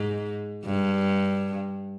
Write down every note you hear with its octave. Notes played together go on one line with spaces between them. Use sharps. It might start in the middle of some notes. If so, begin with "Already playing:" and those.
Already playing: G#2
G2